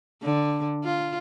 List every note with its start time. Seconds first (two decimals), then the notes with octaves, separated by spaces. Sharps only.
0.23 D3
0.85 F4